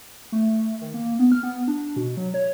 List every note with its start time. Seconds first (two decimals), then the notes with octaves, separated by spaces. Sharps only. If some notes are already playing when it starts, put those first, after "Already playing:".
0.32 A3
0.81 D#3
0.94 A#3
1.19 B3
1.32 F6
1.43 B3
1.68 D4
1.96 B2
2.17 F#3
2.34 C#5